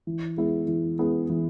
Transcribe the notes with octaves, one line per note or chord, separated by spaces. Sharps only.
E3
G#3 B3 E4 G#4
E3
G#3 B3 E4 G#4
E3